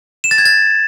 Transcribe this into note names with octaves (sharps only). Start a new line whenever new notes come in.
E7
A6
G#6
A6